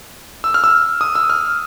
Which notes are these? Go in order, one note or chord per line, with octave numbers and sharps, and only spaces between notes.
E6
F6
E6
D#6
E6
F6